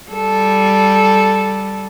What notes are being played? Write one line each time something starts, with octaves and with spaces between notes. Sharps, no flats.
G3 A4